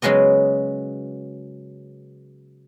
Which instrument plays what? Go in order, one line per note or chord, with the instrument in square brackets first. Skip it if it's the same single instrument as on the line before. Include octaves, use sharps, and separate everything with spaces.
[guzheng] C#3 F#3 G#3 B3 D#5